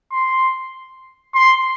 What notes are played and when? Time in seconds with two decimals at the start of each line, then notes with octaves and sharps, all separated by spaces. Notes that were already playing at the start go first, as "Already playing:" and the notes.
0.12 C6
1.35 C6